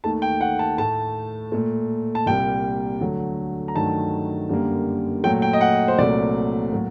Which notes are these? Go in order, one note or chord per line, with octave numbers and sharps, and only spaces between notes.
D#2 D#3 A3 A5
G5
F#5
A5
A2 A3 A5
A#2 A3
A5
C2 A#2 G3 A#3 G5
D2 D3 F#3 A3
A#5
G2 D#3 F#3 A3 A5
F#2 D3 G3 A#3
A#2 F#3 A3 G5
G5
D#5
F#5
C5
C2 A#2 F#3 A3 D5
A2 F#3 A#3